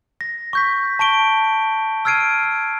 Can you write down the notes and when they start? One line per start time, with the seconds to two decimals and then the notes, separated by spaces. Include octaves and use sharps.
0.21 A#6
0.53 C#6 G6 B6
0.99 A5 C#6 D7 G7
2.05 E6 F6 G#6 C7 D7 D#7